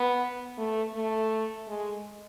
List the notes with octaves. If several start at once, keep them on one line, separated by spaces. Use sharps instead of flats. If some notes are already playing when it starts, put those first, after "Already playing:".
Already playing: B3
A3
A3
G#3